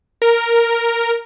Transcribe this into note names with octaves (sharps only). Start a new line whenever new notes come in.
A#4